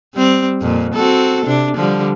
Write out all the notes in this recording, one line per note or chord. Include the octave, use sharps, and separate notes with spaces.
G3 C4
F2 A#2
C4 F#4 A4
C3 D4
D3 F3 G3